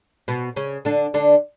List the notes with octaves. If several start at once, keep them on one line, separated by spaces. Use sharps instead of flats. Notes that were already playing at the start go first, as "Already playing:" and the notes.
B2 B3
C#3 C#4
D3 D4
D3 D4